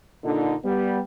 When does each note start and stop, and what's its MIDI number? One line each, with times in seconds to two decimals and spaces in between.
0.24 0.54 46
0.24 0.54 50
0.24 0.54 63
0.64 1.00 55
0.64 1.00 59